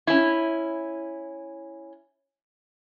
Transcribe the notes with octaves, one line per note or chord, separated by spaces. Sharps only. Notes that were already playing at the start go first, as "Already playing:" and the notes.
C#4 E4